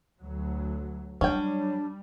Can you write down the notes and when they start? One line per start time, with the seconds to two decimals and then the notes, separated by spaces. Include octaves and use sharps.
0.20 D2 F#3
1.21 F#3 G3 C#4 D4 G5